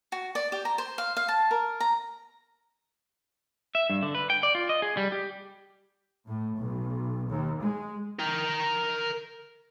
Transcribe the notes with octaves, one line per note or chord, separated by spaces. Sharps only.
F#4
D5
G4
A#5
C5
F5
F5
A5
A#4
A#5
E5
G2
D3
B4
G5
D5
F4
D#5
G#4
G3
G4
A2
B1
D#2
G#3
A#4 G5